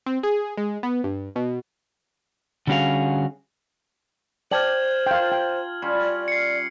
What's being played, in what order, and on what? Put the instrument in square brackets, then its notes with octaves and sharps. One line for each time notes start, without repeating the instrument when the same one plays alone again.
[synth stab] C4
G#4
G#3
B3
G2
B2
[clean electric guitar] D3 G3 C#4 F#4 G#4 F5
[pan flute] C5 [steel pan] D5 G5 A5 [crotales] F6 G#6 F#7
[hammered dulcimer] F4 A5 [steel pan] F5 G5
[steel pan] G5
[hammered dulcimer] G3 C#4 F4
[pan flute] D5
[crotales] C7 C#7